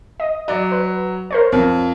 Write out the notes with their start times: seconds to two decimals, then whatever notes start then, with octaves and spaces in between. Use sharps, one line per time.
0.20 D#5
0.48 F#3 D5
0.72 B4
1.31 A#4 C5 C#5
1.52 F2